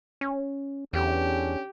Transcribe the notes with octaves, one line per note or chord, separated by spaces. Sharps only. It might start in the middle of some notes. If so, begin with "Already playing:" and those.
C#4
E2 D3 C#4 G4